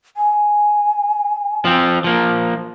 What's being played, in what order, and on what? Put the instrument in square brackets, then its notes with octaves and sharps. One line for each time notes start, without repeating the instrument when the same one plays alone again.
[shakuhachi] G#5
[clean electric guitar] F3 C4
F3 A#3